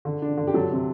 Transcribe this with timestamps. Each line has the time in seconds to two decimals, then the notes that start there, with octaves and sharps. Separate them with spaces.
0.05 D3
0.22 D4
0.37 D3
0.47 G4
0.54 F#3 A4
0.72 C3